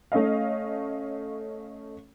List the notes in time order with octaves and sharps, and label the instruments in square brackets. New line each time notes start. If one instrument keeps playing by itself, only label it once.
[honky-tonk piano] A3 C#4 D#5 F5